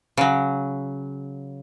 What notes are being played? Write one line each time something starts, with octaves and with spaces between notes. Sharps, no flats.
C#3 F#3